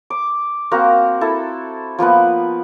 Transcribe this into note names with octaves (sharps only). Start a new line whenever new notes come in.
D6
A#3 C4 F#4 A#4
E4 A4
F3 A#3 B3 B4